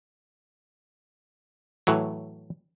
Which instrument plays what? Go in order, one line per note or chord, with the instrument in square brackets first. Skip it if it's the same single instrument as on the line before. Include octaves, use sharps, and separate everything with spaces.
[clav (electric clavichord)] A2 E3 F#3